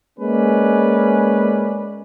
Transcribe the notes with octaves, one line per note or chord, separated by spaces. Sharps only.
G#3 A#3 C#4 B4 D5